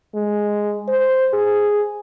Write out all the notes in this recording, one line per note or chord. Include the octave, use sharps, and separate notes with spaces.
G#3
C5
G#4